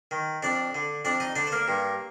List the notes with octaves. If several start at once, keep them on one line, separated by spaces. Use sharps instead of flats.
D#3
F2 D4 D5
D3
F2 D4 D5
D#4 D#5
D3 D4 D5
C5
A#3 A#4
G2